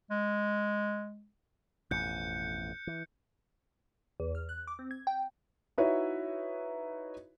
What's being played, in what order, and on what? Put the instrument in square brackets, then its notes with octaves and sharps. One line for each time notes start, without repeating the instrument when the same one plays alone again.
[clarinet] G#3
[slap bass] A1 F2 B2 [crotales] F#6 G6 C#7
[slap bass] E3
[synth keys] E2
F6
F#6
D6
C4
G#6
G5
[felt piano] D#4 E4 F#4 B4 C#5 E5